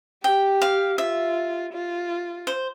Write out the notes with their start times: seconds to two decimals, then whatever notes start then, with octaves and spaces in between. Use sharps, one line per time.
0.23 G4 G5
0.62 F5
0.98 F4 E5
1.73 F4
2.47 C5